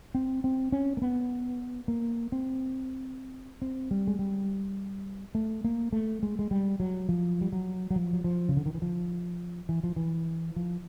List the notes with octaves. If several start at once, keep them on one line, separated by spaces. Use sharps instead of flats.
C4
C4
C#4
A#3
B3
A#3
C4
C4
G3
G#3
G3
A3
A#3
A3
G#3
G#3
G3
F#3
F3
G3
F#3
F#3
F3
F#3
F3
C#3
D3
D#3
E3
F3
E3
F3
E3
F3